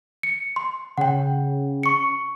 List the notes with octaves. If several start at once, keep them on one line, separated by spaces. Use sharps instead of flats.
C#7
C6
C#3 F#5 G5
C#6 C#7